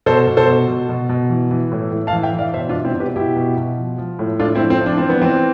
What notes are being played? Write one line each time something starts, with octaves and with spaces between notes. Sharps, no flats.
B2 A4 C5
B2
A4 C5
B2
B2
B2
B2
E3
E3
A2
A2
F5 A5
E3
E5 G5
E3
D5 F5
B2 C5 E5
D4 F4
B2
C4 E4
B2
G4 B4
B2 E4 G4
B2
B2
F3
F3
A2
A2 D4 F4
C4 E4
F3
C4
F3
D4
E3 C4
B3
E3 C4